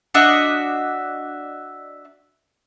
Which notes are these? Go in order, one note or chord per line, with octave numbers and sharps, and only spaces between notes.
D4 F#4 D#5 E5